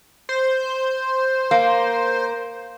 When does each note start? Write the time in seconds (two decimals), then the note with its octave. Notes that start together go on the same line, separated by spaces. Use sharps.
0.29 C5
1.51 A#3